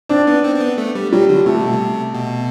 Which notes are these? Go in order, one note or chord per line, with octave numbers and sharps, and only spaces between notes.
C4 D4
B3
C4
C4
B3
A3
G3
F#3 G3
D3
C3 A3
B2
C3
B2